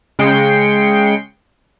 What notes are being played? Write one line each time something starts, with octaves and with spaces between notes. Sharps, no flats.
C#3 G#3 G5 C7 C#7